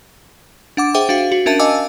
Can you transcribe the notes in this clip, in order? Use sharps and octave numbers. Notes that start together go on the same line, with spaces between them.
D4 F#5 D6
G#4 C5 E5 G5 D6
D4 F#4 F5
F#4
C#4 D4 A#4 E5 A5 D#7
D#5 F5 G#5 A5 D6 E6